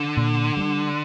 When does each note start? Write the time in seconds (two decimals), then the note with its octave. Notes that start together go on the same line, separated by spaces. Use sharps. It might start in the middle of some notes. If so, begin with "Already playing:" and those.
Already playing: D3
0.17 A#2
0.57 G3 B3 D4